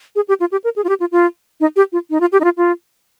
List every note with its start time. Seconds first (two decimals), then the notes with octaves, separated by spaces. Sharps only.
0.16 G#4
0.28 G4
0.40 F4
0.52 G4
0.64 A#4
0.76 G#4
0.84 F4
0.89 G4
1.00 F4
1.12 F4
1.60 D#4
1.76 G4
1.92 F4
2.10 D#4
2.20 F4
2.32 G4
2.41 D#4
2.44 F4
2.57 F4